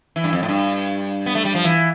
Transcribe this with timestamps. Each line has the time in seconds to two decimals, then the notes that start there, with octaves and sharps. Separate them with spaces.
0.16 E3
0.24 G2
0.33 F2
0.43 A2
0.48 G2
1.26 B3
1.35 A3
1.45 G3
1.55 F3
1.64 E3